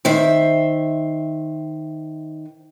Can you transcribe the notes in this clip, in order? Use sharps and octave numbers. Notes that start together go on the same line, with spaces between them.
D#3 C5 E5